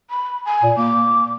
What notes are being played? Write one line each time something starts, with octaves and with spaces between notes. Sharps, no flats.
B5
G#5
A#2
A#3 D6